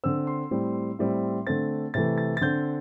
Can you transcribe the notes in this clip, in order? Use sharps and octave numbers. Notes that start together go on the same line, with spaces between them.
D3 C4 E6
C6
A2 G3 C4
A2 G3 C4
D3 A3 C4 A6
C3 E3 A3 A6
A6
A6
D3 C4 G6